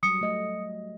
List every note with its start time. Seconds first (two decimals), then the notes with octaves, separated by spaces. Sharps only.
0.03 F#3 G3 D#6 C#7
0.21 A3 D#5